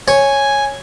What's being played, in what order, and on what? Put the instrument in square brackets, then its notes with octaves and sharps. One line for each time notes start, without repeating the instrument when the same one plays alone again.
[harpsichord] C#5 [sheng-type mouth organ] G#5